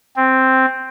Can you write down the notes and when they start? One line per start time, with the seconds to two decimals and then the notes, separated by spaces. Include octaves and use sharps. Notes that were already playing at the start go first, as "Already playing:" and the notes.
0.17 C4